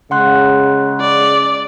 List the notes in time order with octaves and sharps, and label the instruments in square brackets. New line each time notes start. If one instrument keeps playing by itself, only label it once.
[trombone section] C#3 G#3 [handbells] F#5 C6 F#6
[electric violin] D5